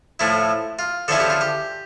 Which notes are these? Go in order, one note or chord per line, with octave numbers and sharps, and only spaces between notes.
A2 F3 A3 E4
F4
D3 F3 C#4 E4 A4
G4
F4
G4